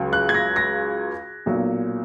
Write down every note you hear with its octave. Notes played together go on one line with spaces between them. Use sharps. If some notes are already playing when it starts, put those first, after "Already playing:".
Already playing: C#2 C#3 F#3
F#6
G#6
A#6
A#6
B1 A#2 F#3